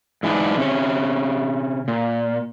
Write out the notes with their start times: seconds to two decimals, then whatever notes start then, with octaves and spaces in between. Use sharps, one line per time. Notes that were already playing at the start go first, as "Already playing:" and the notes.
0.23 G#2 E3 D4 D#4
0.58 C3 C#4
1.88 A#2